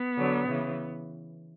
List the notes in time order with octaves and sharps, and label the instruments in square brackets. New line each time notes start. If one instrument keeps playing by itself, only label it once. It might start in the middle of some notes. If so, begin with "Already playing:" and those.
Already playing: [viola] B3
[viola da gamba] D3 F#3
C#3 E3